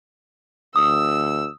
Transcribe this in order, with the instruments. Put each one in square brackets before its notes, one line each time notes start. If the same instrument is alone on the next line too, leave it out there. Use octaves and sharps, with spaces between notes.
[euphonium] D2 [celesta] D#6 [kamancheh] E6